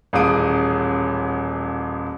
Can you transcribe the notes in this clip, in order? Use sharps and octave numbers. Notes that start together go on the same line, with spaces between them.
D#1 A1 G#4 F5 D#6 D7